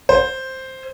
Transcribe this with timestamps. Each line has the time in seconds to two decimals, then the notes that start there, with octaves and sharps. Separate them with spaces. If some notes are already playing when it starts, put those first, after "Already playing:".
0.09 C5